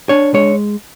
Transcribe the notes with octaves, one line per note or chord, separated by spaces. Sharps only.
D4 C#5
G#3 C#5